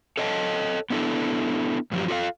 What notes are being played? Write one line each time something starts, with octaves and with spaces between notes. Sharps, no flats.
A4 C#5 D#5 G5 A5
B3 D4 E4 A4
G2 F3 F#3 G4
F4 A4 C5 F5